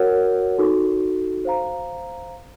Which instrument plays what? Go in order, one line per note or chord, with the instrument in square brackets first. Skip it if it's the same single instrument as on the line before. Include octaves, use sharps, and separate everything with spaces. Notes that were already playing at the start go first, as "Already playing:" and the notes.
Already playing: [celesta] F#4 A#4 C#5 F#5
D#4 F#4 A4
C5 F5 A#5